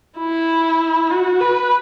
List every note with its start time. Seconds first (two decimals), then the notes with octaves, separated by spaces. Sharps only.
0.18 E4
1.10 F#4
1.41 B4